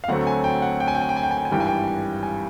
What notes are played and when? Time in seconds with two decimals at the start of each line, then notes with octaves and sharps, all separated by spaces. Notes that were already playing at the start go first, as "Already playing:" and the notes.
0.04 F5
0.08 D2 D3 F#3 A3 C4 F#5
0.27 G#5
0.44 G5
0.62 F#5
0.80 G5
0.88 G#5
0.95 G5
1.01 G#5
1.09 G5
1.16 G#5
1.23 G5
1.31 G#5
1.38 G5
1.45 G#5
1.51 G#1 G2 E3 G3 G5
1.60 G#5
1.67 G5
2.23 G#5